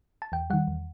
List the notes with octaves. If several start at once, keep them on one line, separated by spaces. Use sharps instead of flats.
A5
E2 G5
D#3 G3 F#5
E2